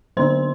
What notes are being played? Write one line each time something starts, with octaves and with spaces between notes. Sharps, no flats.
D3 F#3 B3 D4 C5 C6